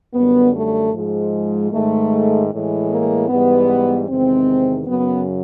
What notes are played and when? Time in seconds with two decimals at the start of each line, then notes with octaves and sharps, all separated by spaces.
0.14 F#2 D3 G3 B3
0.54 A3
0.94 G#2 F3 G#3
1.71 G#2 D#3 G#3 A3
2.51 A2 E3 G#3
2.90 A#3
3.29 G#2 E3 G3 B3
4.08 E2 C3 D#3 G#3 C4
4.87 F#2 C#3 F#3 B3